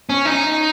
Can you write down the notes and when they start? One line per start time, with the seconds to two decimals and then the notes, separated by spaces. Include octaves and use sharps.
0.09 C#4
0.25 D#4